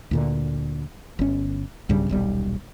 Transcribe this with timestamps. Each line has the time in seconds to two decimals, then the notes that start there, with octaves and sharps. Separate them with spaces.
0.11 D2 A#2 D3
1.19 G1 C#4
1.89 B1 G2 C#3 G3
2.09 D#1 B1 G3